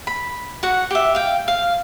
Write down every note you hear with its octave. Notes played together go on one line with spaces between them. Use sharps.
B5
F#4 F#5
G4 E5
F5 G5
F5